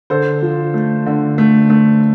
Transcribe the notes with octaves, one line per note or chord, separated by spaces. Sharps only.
D3 A4 C5
F3
A3
D3
A3
A3